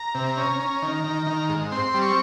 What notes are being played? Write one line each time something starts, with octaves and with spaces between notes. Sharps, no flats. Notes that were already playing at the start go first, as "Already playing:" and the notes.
Already playing: A#5
C3
C#4
C#4
D#3
D#3
D#3
G#2
C4 C6
G3
C#6